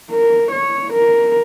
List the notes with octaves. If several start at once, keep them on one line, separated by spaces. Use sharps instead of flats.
A#4
C#5
A#4